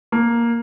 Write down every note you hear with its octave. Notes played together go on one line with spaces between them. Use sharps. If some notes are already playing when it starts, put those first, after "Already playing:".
A#3